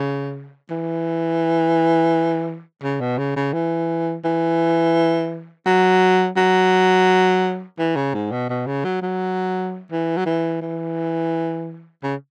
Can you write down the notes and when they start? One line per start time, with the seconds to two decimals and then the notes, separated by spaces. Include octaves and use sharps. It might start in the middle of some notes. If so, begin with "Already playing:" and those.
Already playing: C#3
0.70 E3
2.83 C#3
3.01 B2
3.18 C#3
3.36 C#3
3.54 E3
4.25 E3
5.66 F#3
6.37 F#3
7.79 E3
7.96 C#3
8.14 G#2
8.32 B2
8.50 B2
8.67 C#3
8.84 F#3
9.02 F#3
9.91 E3
10.17 F#3
10.26 E3
10.62 E3
12.03 C#3